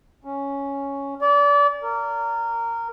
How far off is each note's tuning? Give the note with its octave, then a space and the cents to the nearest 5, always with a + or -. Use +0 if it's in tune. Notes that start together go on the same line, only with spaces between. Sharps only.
C#4 +5
D5 -30
A#4 -15